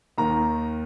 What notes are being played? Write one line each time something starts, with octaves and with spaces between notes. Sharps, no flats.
D#2 D#3 A#5